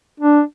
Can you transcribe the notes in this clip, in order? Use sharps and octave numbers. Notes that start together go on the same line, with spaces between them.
D4